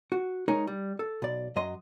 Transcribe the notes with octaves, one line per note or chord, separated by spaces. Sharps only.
F#4
G#3 D#4 G#4 A#4 C#5
G3
A4
B1 D5
F#2 F#3 D#5 C6